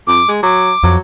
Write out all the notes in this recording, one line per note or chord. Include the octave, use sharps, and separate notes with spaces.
F2 D6
G#3
F#3 D6
F2 F#3